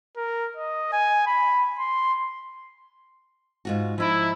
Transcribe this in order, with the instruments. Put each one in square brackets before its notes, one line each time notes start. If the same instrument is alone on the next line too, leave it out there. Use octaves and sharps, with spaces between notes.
[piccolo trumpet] A#4
D#5
G#5
B5
C6
[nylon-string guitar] G#2 F4 F#4
[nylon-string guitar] F3 D#4 [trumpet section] E4